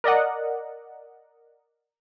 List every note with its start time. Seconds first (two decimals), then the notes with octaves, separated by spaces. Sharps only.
0.04 A#4 D5 D#5 F#5